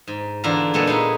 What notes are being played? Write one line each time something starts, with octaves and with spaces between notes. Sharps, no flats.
G#2
E2 D3 D4 E4 F4 A#5
A#2 G#3 A3 B3 A4 C#5
D#4 E4 G#4 C#5